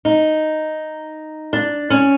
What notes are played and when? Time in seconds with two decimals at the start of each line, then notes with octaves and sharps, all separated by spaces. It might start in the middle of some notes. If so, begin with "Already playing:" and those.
0.05 D#4
1.53 D4
1.90 C#4